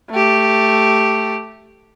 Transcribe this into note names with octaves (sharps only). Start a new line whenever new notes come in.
A3 G4